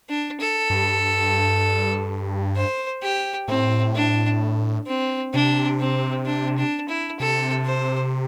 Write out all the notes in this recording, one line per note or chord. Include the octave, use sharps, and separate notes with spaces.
D4
A4
G2
C5
G4
A2 C4
D4
C4
C3 D4
C4
D4
D4
E4
C3 A4
C5